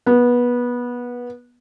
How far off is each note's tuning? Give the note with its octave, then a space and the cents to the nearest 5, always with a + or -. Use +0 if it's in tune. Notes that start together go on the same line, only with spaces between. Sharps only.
B3 -20